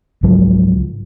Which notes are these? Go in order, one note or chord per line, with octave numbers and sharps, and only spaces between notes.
C#2 G#2 F3 F#3